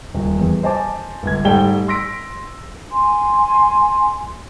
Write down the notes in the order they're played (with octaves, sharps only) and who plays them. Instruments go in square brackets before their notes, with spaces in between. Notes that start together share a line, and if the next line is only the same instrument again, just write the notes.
[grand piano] D#1
E2
C5 D#5 G#5 A5 D6
G1 C#2 G#6
G#2 G3 A3 G5 G7
C6 E6 A#6 B6 D7
[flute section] G#5 C6